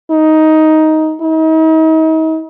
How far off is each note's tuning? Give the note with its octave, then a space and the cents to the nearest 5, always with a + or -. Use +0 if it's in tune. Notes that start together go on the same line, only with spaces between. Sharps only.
D#4 +10
D#4 +40